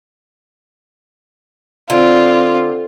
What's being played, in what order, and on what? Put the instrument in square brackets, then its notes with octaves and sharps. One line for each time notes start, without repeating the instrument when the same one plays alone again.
[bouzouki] D3 [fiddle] C4 F4